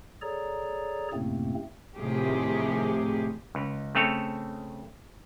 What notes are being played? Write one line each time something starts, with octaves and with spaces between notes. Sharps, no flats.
G#4 A4 C#5 D5 A#5
F#2 A2 C3 A3 A#3 C4
A2 C3 D#3 F3 G4 G#4
C#2
C#3 A3 C4 A4 C#5